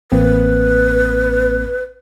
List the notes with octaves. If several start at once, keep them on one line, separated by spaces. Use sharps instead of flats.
A1 A#3 C4 B4